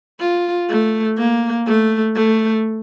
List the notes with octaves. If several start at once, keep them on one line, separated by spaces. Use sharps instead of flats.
F4
A3
A#3
A3
A3